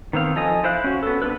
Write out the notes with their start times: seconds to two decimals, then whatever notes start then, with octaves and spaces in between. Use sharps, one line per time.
0.13 D#3 B3 C4 F5
0.36 F3 A4 D#5 G#5 D#6
0.64 E4 C5 F5 F#6
0.84 C#4 F#4
1.03 B3 A4
1.22 B3 C4 D4 A4 B4